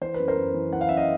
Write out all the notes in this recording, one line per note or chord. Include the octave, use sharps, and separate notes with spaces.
E3 C5
B4
F#2
A#4 C5
F#2
E3
E3 F#5
F5
F#2 E5
D#5 F5